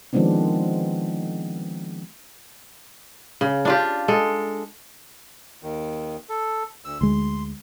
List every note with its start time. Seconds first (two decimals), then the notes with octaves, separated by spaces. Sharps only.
0.13 D#3 F3 G#3 B3 C4 D4
3.41 C#3
3.65 D4 F4 G4
4.08 G#3 A4
5.63 D#2 D#3
6.29 A4
6.85 D2 E6
7.01 D2 G#3 C6